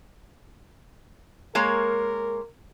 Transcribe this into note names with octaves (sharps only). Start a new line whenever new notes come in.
G#3 A#3 A#4 C#5